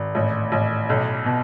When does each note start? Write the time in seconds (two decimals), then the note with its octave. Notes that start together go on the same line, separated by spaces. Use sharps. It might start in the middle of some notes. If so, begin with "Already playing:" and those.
Already playing: G#1
0.15 A1
0.52 A1
0.89 B1
1.26 B2